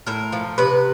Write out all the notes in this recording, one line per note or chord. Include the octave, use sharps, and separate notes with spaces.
A2 A#4
F3
C3 B4